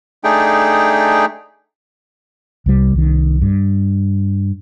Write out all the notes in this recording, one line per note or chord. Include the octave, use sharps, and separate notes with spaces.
A3 D4 D#4 G#4 G5
C2 C3 G3
C2 D#3
G2